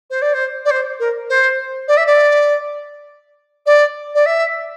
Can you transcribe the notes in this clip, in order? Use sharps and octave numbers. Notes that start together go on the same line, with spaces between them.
C5
D5
C5
D5
C5
A#4
C5
D5
E5
D5
D5
D5
E5